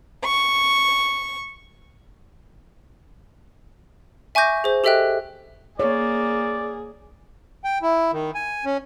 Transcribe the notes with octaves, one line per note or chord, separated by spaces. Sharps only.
C#6
E5 G#5 C#6 D6 G6 A#6
G#4 C5
G4 A4 D#5 E5 G5 F#6
A#3 G#4 C#5 D5
G5
E4
D#3
G#5
C#4